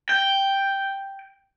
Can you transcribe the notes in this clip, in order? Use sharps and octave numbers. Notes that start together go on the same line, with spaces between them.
G5